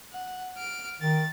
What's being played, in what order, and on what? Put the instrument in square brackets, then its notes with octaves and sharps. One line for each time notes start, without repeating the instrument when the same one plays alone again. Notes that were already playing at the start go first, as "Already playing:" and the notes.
[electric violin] F#5
F6 D7
[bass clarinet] D#3 [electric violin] A6